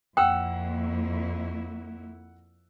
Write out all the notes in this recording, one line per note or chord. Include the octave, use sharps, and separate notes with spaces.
F2 A#3 E4 F#5 G5 E6 F#6